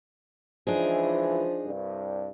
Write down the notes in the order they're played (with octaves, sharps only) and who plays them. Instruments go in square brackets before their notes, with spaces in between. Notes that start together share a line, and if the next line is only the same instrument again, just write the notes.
[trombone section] C#2 E3 [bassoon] F3 [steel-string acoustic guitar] D4 D#4 G#4
[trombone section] C2 G2